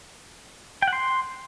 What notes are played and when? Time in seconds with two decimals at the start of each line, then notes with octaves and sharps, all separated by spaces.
0.82 G5
0.88 F#5
0.93 C6